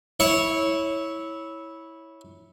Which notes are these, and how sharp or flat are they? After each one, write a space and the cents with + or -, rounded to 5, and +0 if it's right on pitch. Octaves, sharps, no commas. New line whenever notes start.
E4 -15 C#5 +0